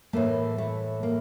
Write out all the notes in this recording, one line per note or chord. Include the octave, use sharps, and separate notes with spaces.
A2 E3 A3 A#3
A3
A#3